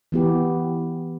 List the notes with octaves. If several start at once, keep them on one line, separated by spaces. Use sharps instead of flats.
E3 B3 G4